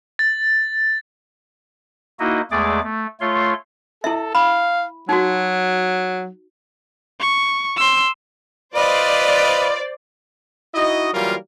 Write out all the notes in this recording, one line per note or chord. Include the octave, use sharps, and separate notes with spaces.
A6
A#3 D#4 E4 F#4 D#5
E2 G#3 A3 G#4 D5 D6
A3
A3 F4 C#5 C6
E4 A4 E5
F5 B5
F#3 D#4 F#4
C#6
C6 E6
F4 B4 C5 D5 D#5
D#4 E4 F#4 D#5
E3 F#3 G3 A#3 F4 A#4